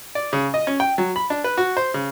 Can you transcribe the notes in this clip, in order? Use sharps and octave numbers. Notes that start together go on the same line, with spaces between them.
D5
C#3
D#5
C#4
G5
F#3
B5
D4
B4
F#4
C5
C#3